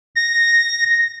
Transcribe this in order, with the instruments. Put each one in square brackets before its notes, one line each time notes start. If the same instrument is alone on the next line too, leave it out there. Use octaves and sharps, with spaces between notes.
[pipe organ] A#6